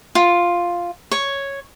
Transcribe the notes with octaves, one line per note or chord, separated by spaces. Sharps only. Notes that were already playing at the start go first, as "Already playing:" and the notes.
F4
C#5